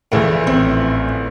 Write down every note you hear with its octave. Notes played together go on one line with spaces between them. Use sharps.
A#1 A2 C#3 E3 A3
A1 C4 C#5